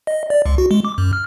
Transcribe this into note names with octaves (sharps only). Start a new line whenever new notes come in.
D#5
D5
C#2
F#4
G#3
D6
F#2
F6